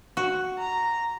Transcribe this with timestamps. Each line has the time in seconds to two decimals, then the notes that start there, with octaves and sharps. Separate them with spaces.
0.17 F#4
0.59 A#5